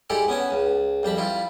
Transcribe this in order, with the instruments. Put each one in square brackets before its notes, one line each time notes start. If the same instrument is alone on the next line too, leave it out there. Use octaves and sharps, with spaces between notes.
[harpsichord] G#3 E4 G4 A4 D5
B3 C#4 G#5 A5
C#2
F2 G3 A5 B5
G3 E4 F4